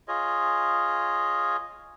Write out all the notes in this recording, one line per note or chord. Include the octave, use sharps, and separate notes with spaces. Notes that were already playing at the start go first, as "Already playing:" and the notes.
F4 G#4 C#5 D#5